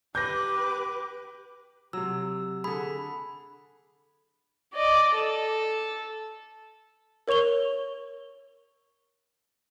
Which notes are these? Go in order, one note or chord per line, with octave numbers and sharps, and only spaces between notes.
G4 B4 D6 G6 A#6
C3 F#3 E6
D3 G#4 B5
D5 D#5
A4
A#4 C#5 C#6 F7 G7